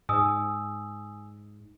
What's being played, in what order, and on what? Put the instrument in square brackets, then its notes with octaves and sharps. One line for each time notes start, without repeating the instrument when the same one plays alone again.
[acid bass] G#2 [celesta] G#5 D#6 E6